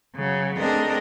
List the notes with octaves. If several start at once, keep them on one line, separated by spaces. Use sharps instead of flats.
C#3 F#3
A3 C4 D4 G#4 A#4 D#5